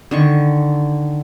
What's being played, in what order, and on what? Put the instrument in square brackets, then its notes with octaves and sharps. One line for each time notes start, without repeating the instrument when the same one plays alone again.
[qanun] D3 D#3 C#6